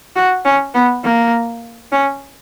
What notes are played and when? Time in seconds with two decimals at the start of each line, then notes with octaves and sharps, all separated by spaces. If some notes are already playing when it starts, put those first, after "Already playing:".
0.16 F#4
0.45 C#4
0.74 B3
1.04 A#3
1.92 C#4